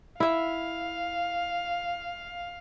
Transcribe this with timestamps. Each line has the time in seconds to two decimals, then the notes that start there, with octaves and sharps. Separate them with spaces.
0.20 E4 E5 F5